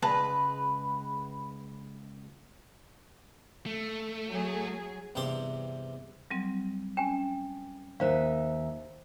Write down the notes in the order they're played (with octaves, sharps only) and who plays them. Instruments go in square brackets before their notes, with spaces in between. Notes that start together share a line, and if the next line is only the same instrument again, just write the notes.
[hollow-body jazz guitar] C#2 G#3 A5 [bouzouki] B4
[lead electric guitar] A3
[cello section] F#3 G#4
[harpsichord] E2 G2 C3 G4 C5 C6
[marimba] F#3 G3 C4
[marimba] C#4 [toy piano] G5 G#5
[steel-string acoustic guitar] D#2 D#4 E5 [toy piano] C5 F5